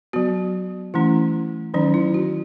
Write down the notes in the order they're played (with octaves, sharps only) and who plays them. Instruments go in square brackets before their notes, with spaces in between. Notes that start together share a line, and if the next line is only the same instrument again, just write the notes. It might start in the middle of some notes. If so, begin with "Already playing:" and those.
[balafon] F#3 B3 F#4
E3 A3 C#4 E4
D#3 F#3 C#4 D#4
E4
F#4